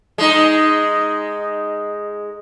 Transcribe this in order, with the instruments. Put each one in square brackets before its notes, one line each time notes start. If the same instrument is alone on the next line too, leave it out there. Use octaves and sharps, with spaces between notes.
[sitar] G#3 D#4